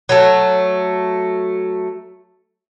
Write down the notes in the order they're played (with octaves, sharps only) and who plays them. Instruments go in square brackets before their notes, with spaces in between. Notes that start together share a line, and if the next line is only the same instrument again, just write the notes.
[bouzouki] F#3 A3